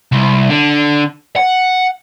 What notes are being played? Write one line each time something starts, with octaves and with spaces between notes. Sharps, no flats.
C2
D3
F#5